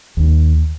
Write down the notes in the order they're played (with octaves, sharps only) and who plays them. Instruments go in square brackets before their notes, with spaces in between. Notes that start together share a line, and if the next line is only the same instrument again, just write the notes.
[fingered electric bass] D#2